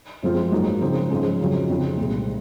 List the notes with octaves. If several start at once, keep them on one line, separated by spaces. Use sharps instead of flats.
F#2 F3 G#3 C4 F4
G#2 F#3 A#3 D#4
C#3 F3 G#3 C4 D#4
G#2 F3 G#3 C#4
F2 C#3 F#3 C4 F4
F2 C#3 F3 C4 D#4
C2 A#2 G#3 C4